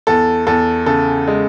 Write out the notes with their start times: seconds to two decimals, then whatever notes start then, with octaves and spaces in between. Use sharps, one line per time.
0.07 E2 A4
0.47 E2 A4
0.86 C#3 A4
1.27 G#3